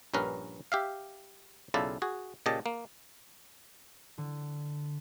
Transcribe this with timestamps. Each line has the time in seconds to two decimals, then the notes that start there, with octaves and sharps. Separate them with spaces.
0.14 A#1 G2 C#4 A#4 B4
0.72 G4 E5 F5
1.74 B1 C#3 E4 F4 A4 D5
2.02 F#4 G#4
2.46 A#2 C#3 G4 D#5 A5
2.66 A#3
4.18 D3